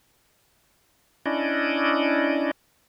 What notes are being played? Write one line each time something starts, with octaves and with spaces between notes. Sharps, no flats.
C#4 D4 E4 D5 D#5